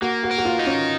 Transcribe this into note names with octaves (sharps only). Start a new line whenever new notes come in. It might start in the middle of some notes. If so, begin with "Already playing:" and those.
A#3 F#4
F#4
A#4
F#4
F4
D#4
C#4